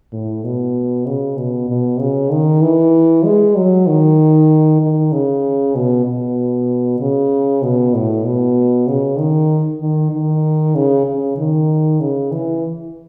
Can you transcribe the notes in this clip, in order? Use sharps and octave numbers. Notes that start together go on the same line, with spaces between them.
A2
B2
C#3
B2
B2
C#3
D#3
E3
G#3
F#3
D#3
D#3
C#3
B2
B2
C#3
B2
A2
B2
C#3
D#3
D#3
D#3
C#3
C#3
D#3
C#3
E3